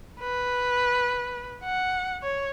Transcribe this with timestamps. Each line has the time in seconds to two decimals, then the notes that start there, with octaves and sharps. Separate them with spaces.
0.21 B4
1.64 F#5
2.23 C#5